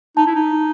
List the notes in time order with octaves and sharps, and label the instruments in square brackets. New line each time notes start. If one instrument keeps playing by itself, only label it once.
[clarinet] D#4 [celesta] A5
[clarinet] E4
D#4